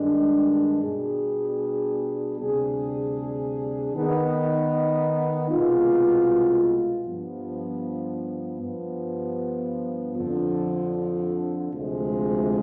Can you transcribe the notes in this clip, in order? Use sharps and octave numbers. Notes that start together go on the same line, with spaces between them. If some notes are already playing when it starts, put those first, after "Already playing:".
Already playing: G2 D#3 G#3 D4
B2 G3 D4 G#4
D2 C3 G3 D4 G#4
D#3 B3 D#4
C2 B2 G#3 B3 F4
G2 F3 B3
G2 F3 B3
F2 D3 F3
D2 C3 F3 G#3